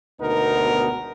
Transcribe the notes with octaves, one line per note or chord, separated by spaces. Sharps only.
G#1 D2 B2 B3 D#4 A#4